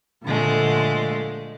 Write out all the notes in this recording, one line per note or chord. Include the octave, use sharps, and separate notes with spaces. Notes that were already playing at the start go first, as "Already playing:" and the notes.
A#2 D3 F3 G#3 A3